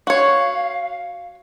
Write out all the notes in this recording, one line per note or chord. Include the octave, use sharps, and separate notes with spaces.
F#4 C#5 F5